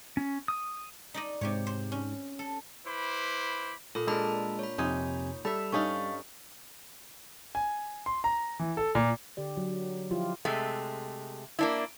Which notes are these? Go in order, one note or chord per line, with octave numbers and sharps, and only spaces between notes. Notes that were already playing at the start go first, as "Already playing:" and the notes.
C#4
D#6
D#4 D5 D#5
G#2 C3 G4 C#5
C5
C#4
A4
E4 B4 C5 B5 D6
A#2 A4 B5
G#3 D4 A#4 A5 B5 E6
C#5 B5
F2 C3 D#4 G#5
G3 A4 E5 B5
G2 C#4 D#4 D#5 F5 C#6
G#5
C6
A#5
E3
A4
A#2
D3 G4 D5
F#3
F3 E4 F4 G4
C3 G#3 A3
A#3 D4 E4